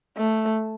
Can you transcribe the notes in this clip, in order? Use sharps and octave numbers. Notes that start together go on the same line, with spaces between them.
A3